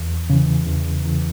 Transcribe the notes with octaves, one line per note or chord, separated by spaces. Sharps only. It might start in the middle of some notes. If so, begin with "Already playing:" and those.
Already playing: E2
C#3 E3
E2
C#3 E3